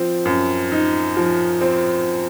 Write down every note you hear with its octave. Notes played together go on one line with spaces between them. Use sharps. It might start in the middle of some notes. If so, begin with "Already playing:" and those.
Already playing: F3 C4
F#2
D#4
F3
C4